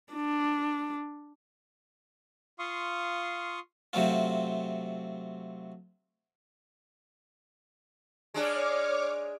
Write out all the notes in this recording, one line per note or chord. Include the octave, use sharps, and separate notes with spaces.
D4
F4 F5 C6 C#6 D#6
C3 F#3 A3 C4 F4
G#3 D4 G#4 C#5 D6 F6